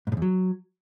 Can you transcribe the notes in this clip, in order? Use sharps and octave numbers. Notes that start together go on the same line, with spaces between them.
G#2
A2
E2
F#3